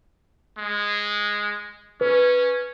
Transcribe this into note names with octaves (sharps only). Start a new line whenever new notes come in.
G#3
C#4 B4